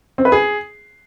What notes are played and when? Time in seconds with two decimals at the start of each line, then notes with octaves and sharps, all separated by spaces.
0.18 C4
0.25 B4
0.32 G#4